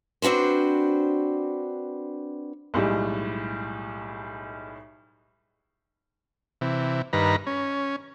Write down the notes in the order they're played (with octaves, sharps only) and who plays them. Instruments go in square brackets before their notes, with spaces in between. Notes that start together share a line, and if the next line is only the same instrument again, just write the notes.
[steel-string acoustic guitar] C4 D4 F#4 B4 C5
[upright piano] B1 A2 G3 G#3
[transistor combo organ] C3 E3
G2 D#3 B4 A#5
C#4